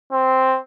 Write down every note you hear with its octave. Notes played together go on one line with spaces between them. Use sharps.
C4